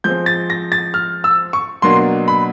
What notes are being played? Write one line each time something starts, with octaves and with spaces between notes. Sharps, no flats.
F3 G#3 C4 G6
A6
A#6
A6
F6
E6
C#6
B2 F#3 A#3 D4 C6
B5